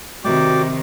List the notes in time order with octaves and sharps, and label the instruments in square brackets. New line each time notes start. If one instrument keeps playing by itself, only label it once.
[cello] C3 D#3 [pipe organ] F#4 [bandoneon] D5 G5 D6